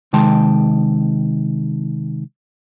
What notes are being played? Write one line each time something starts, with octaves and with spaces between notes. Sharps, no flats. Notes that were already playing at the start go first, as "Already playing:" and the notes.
C3 D#3 G#3 G5 A5 C6